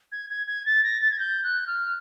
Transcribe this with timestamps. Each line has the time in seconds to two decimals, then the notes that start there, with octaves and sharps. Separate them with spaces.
0.12 G#6
0.30 G#6
0.47 G#6
0.66 A6
0.84 A#6
1.02 A6
1.11 G#6
1.19 G6
1.44 F#6
1.67 F6